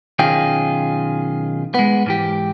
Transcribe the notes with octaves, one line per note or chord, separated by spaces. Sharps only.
B1 D#3 C#4 F4 G#4 G5
G#3 B3
G#2 E3 G4